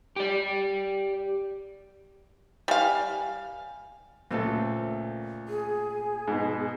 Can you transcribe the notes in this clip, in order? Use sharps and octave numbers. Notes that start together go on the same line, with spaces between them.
G4 D5
G3 F5 G#5
C#2 A#2 A3 C4 A4
G#4
G#2 B2